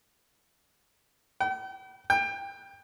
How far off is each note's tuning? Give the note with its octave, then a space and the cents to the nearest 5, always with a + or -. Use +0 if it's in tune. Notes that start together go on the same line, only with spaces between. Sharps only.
G5 -45
G5 +20